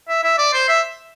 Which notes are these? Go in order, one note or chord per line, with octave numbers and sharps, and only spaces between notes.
E5
E5
D5
C5
E5